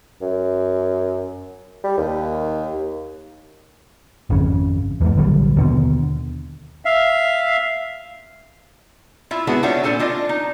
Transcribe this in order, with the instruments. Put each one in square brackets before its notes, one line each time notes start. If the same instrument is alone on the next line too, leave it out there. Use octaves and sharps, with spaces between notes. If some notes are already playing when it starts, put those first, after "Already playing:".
[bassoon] F#2
G3
D#2
[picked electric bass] G#1 F2 C#3
E2 G#2
A#1 D3 F#3 G3
D#2 B2 D3
[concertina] E5 F5
[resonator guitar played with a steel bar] E4 F4 E5
G#3 B3 D4 E4 F#4 G#4
D4 D#4 F4 F#4 C#5 E5
A#2 D4 A4 C5 G#5
D4 F4 D#5
D#4